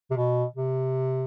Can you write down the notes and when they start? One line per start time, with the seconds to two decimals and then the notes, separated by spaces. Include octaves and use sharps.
0.10 C3
0.16 B2
0.56 C3